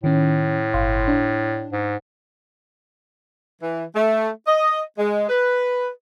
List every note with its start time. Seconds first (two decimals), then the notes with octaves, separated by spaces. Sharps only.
0.04 A2 D#3 C#4
0.74 G1 F5 C6
1.08 D4
1.72 G#2
3.62 E3
3.95 A3
4.47 D#5
4.99 G#3
5.29 B4